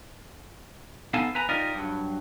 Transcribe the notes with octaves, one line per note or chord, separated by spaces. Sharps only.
B3 D#4 A4 F5 G#5 A5
B4 G#5 A#5
D#4 F4 G4 A#4 D5 D#5
G2 F#3